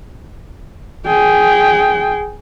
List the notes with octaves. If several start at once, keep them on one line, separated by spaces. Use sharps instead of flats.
G#4 G5